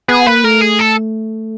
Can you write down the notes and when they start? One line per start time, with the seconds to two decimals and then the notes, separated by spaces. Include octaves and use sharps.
0.08 B3 G#4
0.27 A#3 B4
0.44 A3 A#4
0.62 G#4
0.80 A4